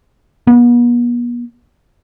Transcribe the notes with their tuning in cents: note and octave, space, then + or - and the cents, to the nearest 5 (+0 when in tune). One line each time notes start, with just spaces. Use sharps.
B3 -45